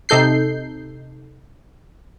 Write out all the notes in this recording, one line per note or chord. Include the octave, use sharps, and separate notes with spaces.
C3 D#4 A4 G6 C7